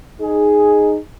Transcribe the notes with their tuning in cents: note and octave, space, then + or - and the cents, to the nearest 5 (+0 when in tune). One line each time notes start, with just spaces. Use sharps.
D#4 -15 G#4 +0